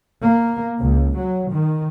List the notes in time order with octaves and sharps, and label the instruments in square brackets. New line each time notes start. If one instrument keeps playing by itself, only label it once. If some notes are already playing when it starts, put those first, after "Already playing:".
[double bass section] A#3
C#2
F#3
D#3